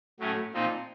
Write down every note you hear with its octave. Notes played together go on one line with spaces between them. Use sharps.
A2 F#3 A3 C#4
A#2 F3 C4 D#4